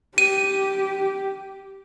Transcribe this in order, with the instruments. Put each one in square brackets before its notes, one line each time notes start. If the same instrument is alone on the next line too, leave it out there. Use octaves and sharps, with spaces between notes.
[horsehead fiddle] G4 [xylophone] D#7